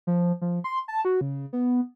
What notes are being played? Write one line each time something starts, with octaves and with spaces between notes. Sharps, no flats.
F3
F3
C6
A5
F#4
C#3
B3